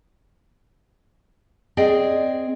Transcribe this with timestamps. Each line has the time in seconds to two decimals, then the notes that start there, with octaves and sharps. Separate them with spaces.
1.77 C4 G#4 D5 D#5 G5